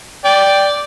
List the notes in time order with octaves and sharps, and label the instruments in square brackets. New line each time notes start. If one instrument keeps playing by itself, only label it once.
[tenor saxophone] D5 [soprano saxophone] G5